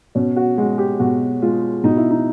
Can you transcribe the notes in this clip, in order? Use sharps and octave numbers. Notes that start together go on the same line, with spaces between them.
B2 C#4
F#4
G#3 F#4
G4
B2 F#4
G#3 F4
B2 D#4
E4
D#4